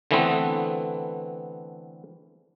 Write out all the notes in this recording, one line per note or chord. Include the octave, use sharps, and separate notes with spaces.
D3 E3 A3 B3 C4